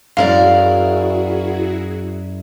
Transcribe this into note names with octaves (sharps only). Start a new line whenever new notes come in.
F#2 E4 F#4 G#4 A#4 D5 F5